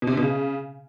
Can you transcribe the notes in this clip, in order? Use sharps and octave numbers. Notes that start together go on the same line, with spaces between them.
B2
C3
D3
B2
C#3